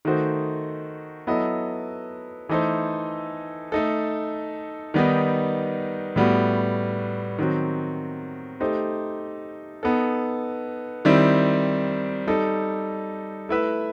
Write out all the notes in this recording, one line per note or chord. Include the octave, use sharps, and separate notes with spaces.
D#3 A3 D#4 F#4 C5
F#3 B3 E4 A4 D#5
E3 A3 D#4 A4 C5
A3 D#4 A4
D#3 G3 B3 D#4
A2 G3 B3 F#4
D#3 F#3 C4 F#4
A3 D#4 G4 C5
B3 D#4 A4
D#3 G3 C4 E4
G3 D#4 A4
A3 E4 B4 E5